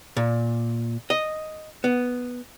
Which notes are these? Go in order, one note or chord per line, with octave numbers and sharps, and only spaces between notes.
A#2
D#5
B3